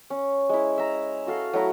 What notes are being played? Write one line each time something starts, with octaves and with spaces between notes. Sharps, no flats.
C#4
G#3 E4
E5 A#5
F#4 A4 F5
F#3 A3 E4 A#5